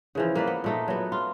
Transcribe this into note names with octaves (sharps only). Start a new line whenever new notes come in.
C#3 E3 F3
A#3 B4 D5
B3
A#2 A3 D#4
F#3 B3
F4